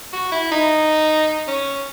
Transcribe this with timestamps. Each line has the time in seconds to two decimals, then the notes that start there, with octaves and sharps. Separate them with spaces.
0.13 F#4
0.32 E4
0.52 D#4
1.48 C#4